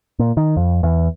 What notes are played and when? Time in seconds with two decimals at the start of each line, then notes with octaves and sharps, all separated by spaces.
0.19 A#2
0.37 D#3
0.57 F2
0.83 E2